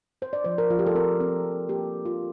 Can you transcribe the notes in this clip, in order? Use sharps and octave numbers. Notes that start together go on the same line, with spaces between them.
C4 C5
D5
F3 C5
A#4
F3 F4
G4
A4
C4 A#4
C4
F3
A#3 G4
D4
F4